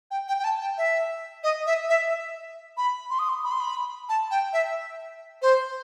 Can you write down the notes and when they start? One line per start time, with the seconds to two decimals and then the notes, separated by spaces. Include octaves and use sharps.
0.11 G5
0.28 G5
0.39 G5
0.44 A5
0.61 G5
0.78 E5
1.44 D#5
1.66 E5
1.89 E5
2.77 B5
3.10 C6
3.19 D#6
3.29 C6
3.44 B5
3.51 C6
3.60 B5
4.09 A5
4.31 G5
4.53 E5
5.42 C5